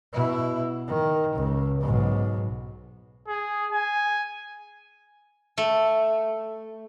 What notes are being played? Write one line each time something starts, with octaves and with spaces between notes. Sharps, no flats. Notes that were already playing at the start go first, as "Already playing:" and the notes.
B2 E4
D#3
C#2
B1 G#2
G#4
G#5
A3